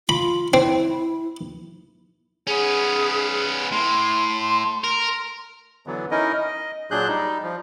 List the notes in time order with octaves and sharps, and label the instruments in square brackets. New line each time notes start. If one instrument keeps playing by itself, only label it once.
[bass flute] F4 [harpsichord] B5
[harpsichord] C4 [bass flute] E4
[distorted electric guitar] B3 C#4 [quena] G#4
[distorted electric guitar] A2 [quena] C6
[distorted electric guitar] A#4
[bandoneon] D3 E3 F#3 B3
C#4 D#4 E4 A#4 D#5
D#5
A#2 F#3 D4 G#4 F#6 G6
G3 D#4
F3